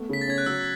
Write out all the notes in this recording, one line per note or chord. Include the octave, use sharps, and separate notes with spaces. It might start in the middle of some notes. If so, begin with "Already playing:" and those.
Already playing: A3 B3
C#3 B6
A6
C#4 G#6
F#6
F#3 E6